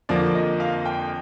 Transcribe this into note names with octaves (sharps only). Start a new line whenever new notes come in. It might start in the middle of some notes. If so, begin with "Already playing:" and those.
F2 D3 F3 A#3 D5
D#5
F5
G5